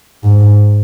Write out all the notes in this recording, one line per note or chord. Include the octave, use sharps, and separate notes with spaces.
G#2